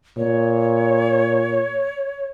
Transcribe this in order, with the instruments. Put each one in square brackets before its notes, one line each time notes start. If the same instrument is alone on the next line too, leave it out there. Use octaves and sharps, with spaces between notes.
[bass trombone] A#2 [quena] C#5